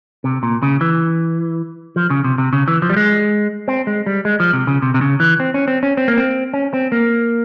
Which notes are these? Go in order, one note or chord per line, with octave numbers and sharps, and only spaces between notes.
C3
A#2
C#3
E3
F3
C#3
C3
C3
C#3
E3
F3
G3
G#3
C4
G#3
G3
G#3
F3
C3
C#3
C3
C3
C#3
E3
C4
C#4
C4
C#4
C4
A#3
C4
C#4
C4
A#3